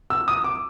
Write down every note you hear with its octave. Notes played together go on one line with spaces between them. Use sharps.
E6
D#6
D6